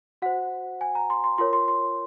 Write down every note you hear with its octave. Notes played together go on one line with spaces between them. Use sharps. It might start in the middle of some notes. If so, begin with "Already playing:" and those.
F#4 C5 F#5
G#5
A#5
C6
C6
F4 A#4 C#5 C6
C6
C6